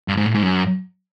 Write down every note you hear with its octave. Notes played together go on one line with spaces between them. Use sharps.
G2
G#2
A2
G#2
F#2